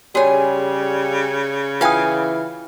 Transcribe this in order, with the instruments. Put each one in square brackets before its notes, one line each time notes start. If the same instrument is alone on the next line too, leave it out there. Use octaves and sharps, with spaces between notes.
[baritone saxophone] C#3 [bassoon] G3 [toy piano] F#4 C#5 [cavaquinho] G#4 G#5
[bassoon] E3 [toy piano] F4 G5 D#6 [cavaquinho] F5 G#5